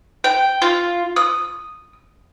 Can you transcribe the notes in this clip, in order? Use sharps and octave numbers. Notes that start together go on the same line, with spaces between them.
G5
F4
D#6